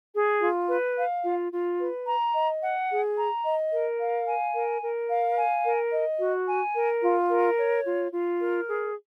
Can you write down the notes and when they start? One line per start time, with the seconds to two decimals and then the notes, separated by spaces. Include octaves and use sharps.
0.15 G#4
0.41 F4
0.69 B4
0.97 F5
1.24 F4
1.52 F4
1.80 B4
2.07 A#5
2.35 D#5
2.62 F#5
2.90 G#4
3.17 A#5
3.44 D#5
3.72 A#4
4.00 F5
4.27 G#5
4.55 A#4
4.82 A#4
5.10 F5
5.37 G#5
5.64 A#4
5.92 D#5
6.20 F#4
6.48 G#5
6.75 A#4
7.02 F4
7.30 A#4
7.58 C#5
7.85 F4
8.12 F4
8.40 A#4
8.68 G#4